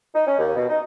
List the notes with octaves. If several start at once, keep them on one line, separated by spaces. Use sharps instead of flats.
D#4
C#4
D#2
B2
D#4